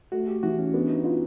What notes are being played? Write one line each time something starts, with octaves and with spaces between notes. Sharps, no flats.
A3 F#4
G4
E3 F#4
C#4
B3 D4
D#4
E4 F4